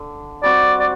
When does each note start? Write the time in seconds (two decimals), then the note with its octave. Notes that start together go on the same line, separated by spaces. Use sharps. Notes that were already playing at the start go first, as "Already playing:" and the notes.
Already playing: D3
0.43 G3 C4 F#4 D5
0.80 D5